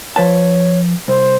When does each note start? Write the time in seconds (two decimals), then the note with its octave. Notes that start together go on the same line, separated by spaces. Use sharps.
0.16 F3 B4 C#5 A5
1.08 C2 C5